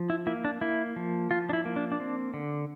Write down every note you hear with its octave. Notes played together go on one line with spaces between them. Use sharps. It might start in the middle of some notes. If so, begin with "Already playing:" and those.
Already playing: F3
E4
A#3 E4
D4
A#3 E4
F3
F3 F4
D4
E4
A#3
D4
D4
C4
D3